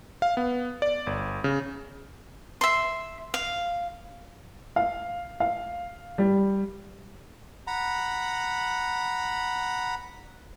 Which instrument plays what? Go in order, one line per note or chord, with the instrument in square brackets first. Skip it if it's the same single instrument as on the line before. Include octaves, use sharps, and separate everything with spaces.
[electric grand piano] F5
B3
D5
G1
C#3
[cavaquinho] E5 C6
F5
[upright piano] F5
F5
G3
[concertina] F#5 A#5 B5